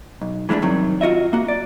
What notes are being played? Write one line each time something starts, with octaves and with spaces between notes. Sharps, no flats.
B1
E3 G#3 A3 C4 D4
G2 C3 D#3 F#3
F4 F#4 D#5 E5
A#3 F#4
D5